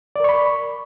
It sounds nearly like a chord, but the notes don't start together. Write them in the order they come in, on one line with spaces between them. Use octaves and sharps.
D5 A#4 C#6 B5